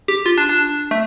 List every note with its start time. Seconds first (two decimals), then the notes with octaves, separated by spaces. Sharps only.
0.08 G4
0.26 F4
0.38 D4
0.49 D4
0.91 A3